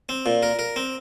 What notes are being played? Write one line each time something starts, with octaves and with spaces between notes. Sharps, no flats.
C4
A#2
A#4
A#4
C4